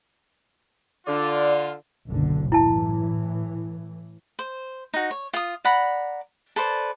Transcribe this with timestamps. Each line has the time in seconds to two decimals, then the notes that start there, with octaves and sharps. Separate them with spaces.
1.07 D3 F4 D5
2.08 F#1 B1 D3
2.52 A2 E3 E4 A5
4.39 C5
4.94 D#4 F#4
5.11 C#5
5.33 F4 D#6
5.64 D5 F#5 A#5 B5
6.56 A4 B4 C5 D5